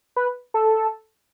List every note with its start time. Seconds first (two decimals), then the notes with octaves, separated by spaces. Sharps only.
0.16 B4
0.54 A4